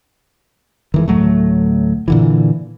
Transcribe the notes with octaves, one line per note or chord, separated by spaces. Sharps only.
D#3 E3 G#3
D2 A2 F#3 A3
A#2 D3 E3